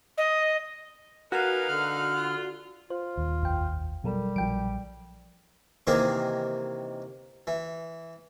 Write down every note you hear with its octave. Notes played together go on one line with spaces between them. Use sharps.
D#5
D#4 F#4 A#4 B4 F5 G#5
D3 F6 F#6
F4
F4 C5
D#1 D#2
G#1 F2 G5
B2 F#3 G3 A4 A#4
A#1 F3 F#3 G5 D7
C3 D#3 E3 A#3 G4 G#4
E3